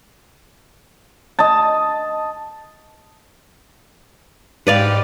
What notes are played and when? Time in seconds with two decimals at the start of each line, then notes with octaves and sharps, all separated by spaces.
1.39 D#5 A5
4.67 G#2 G4 B4 D5 F5